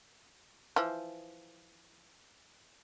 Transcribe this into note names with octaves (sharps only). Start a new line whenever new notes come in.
E3 F3